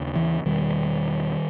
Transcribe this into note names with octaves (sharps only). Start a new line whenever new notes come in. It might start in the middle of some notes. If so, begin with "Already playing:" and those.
Already playing: D#2 C#3
E3
E2 B2 D#3 G3